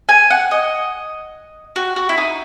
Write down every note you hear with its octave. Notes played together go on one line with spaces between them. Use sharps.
G#5
F#5
D#5
F#4
F#4
E4
D#4